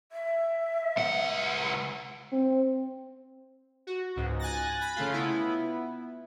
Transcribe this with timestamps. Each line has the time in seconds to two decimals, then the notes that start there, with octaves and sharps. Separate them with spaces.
0.12 E5
0.98 C#2 F#5
2.32 C4
3.87 F#4
4.16 C#2 G#2
4.39 G#5 F#6 A6 A#6
4.81 B5
4.96 C#3 A3 F4
5.13 B3 E4